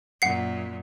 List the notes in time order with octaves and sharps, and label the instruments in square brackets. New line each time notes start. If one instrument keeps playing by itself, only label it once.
[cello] F#2 A#2 [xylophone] F#5 C7